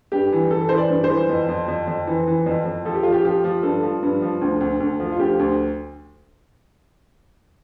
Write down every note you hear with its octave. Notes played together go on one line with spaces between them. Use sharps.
G2 G4
E3
E3 A4
E3 C5
D5
G2
C5
E3
F2
F2
F2
F2
E3
E3
F2
F2
F3 A4
G4
F3 F4
G4
F3 G4
F3
G2 A4
F3
G2
F3
D2
D2
D2
F3
F4
D2 G4
D2